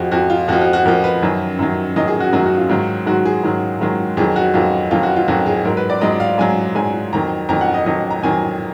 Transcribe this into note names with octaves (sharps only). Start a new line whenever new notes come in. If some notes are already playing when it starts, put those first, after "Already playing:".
Already playing: F2 F3 F#4 G#4
F2 F3 F#4
F4
F2 F3 F#4
F#4
F#4
F2 F3 A#4
B4
F#2 D#3 F#3
F#2 D#3 F#3
F#2 D#3 F#3 D#5
G#4
F#4
F#2 D#3 F#3 F#4
F#4
F4
G#2 D#3 F#3
G#2 D#3 F#3 F#4
G#4
G#2 D#3 F#3
G#2 D#3 F#3
F2 D#3 F#3 G#4
F#4
F2 D#3 F#3 F4
F2 D#3 F#3 F4
F#4
F4
F2 D#3 F#3 F#4
G#4
G#2 F#3 A#4
B4
D5
G#2 F#3 D#5
F5
G#2 F#3 G#5
G#2 F#3 G#5
F2 D#3 F#3 A#5
F2 D#3 F#3 A#5
F#5
D#5
F2 D#3 F#3 D#5
A#5
F2 D#3 F#3 G#5